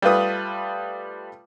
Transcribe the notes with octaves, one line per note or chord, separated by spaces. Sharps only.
G3 A3 F4 B4 D#6